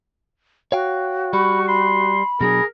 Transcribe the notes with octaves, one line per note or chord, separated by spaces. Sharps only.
F#4 C#5 F5 G5
G3 B5 C#6
B5 C6
B2 F#3 D4 G#4 A#4